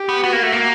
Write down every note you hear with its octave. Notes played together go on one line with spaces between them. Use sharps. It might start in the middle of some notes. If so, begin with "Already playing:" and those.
Already playing: G4
B3
B3 F#4
A#3
A3
A#3